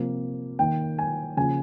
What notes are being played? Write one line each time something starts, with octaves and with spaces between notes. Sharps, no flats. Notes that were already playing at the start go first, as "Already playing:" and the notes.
Already playing: C3 F3 A#3
D#3 A#3 G5
G#5
C#3 F3 A#3 G#5